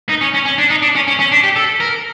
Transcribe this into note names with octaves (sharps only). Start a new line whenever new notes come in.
D#4
C#4
C#4
C#4
D4
D#4
D4
C#4
C#4
C#4
D4
G4
A4
A#4